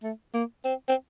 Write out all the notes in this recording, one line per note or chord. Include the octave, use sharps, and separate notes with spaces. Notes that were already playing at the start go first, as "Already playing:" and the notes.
A3
A#3
C4
C4